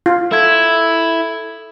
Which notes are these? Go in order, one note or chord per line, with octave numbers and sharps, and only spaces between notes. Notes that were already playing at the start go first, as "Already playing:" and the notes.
F4
E4 A4 G#6